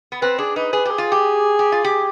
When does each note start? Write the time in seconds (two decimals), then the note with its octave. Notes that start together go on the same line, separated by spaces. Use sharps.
0.12 B3
0.22 C4 B4
0.38 D4 G#4
0.56 D#4 B4
0.73 G#4 B4
0.85 G4
0.91 G#4
0.98 F4
1.12 G4
1.59 G4
1.72 F4
1.84 G4